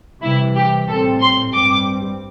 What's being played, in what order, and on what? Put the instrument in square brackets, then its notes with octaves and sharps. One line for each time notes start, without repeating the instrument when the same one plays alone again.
[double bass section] C3 E3 G3 [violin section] E4
[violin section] G4
[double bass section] A2 G3 C4 [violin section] A4
[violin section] C6
[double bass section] G2 G3 C4 [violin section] D6